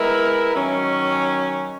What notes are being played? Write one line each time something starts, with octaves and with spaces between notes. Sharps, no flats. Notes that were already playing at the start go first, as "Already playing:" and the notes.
Already playing: G#3 B3 E4 A#4
D#3 F#3 C#4